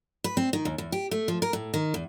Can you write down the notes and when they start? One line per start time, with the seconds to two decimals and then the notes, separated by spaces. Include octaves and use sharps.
0.24 B4
0.37 C4
0.53 D#3
0.65 D#2
0.78 E2
0.92 G4
1.11 A3
1.28 F3
1.42 A#4
1.53 A2
1.74 D#3
1.94 E2